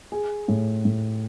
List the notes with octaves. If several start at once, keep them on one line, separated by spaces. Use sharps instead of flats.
G#4
A2
A2